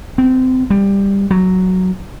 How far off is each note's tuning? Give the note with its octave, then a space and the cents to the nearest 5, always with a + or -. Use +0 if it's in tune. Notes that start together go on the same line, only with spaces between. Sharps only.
C4 -25
G3 +15
F#3 +0